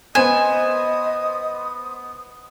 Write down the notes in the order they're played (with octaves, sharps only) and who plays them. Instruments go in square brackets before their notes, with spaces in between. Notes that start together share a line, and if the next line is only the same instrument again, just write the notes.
[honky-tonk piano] B3 C5 E7 [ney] D#5 [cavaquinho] G#5 [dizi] D#6